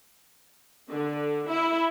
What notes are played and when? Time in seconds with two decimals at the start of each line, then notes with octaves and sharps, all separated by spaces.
0.90 D3
1.49 E4